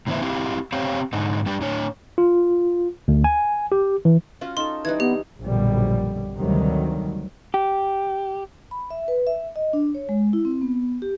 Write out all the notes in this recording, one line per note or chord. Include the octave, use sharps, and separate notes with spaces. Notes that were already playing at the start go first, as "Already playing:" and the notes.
A2 D3 E3 B3 C5 E5
C4 E4 F4 G4
C4 G4 C5 C#5 F5
G#2 D3 D#4
G3 D4 G4
A2 D4 C#5
F4
D2
G#5
G4
E3
C#4 F4 F#4
D#4 A4 C6
E3 G3 D#4 B4 G#6
B3 G4
A#1 F#2 B2 D3 G3
D2 C3 D#3 F#3 G3
G4
B5
E5
B4
E5
D#5
D4
C#5
G#3
E4
C4
B3
G4